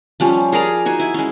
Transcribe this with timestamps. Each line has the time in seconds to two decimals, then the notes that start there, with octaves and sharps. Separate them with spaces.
0.20 F3 G3 C#4
0.52 G#4 A#4 D5 A#5
0.85 D#4 F#4 G#5
1.00 E4
1.14 G#3 C#4